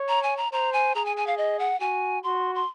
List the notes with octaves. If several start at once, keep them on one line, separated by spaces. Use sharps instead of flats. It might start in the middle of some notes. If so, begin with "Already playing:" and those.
Already playing: C#5
A#5
G#5
A#5
C5 A#5
G#5
G#4 A#5
G#5
G#5
F5
D#5
F#5
F#4 G#5
F#4 C6
C6